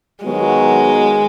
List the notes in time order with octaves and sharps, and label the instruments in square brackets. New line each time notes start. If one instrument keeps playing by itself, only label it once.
[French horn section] D#3 F#3 B3 F#4 [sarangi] G#3